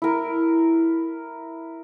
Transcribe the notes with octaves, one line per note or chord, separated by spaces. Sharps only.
E4 A#4